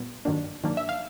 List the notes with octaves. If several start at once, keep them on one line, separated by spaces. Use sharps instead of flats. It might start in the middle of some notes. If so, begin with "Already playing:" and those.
Already playing: A#2 G3 B3
G2 D#3 F#3 A#3 D4
G2 D#3 F#3 A#3 D4
E5
F5